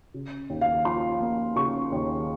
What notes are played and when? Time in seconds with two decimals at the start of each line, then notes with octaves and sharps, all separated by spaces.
0.14 C#3
0.50 D#2
0.61 F5
0.85 F3 C6
1.20 A#3
1.56 C#3 C#6
1.92 D#2